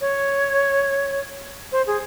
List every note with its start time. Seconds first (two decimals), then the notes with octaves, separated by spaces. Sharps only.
0.01 C#5
1.72 C5
1.87 G#4